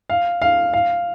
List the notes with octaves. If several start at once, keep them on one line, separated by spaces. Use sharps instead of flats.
F5
F5
F5